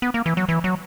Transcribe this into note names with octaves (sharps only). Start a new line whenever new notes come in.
B3
A#3
E3
F#3
E3
F#3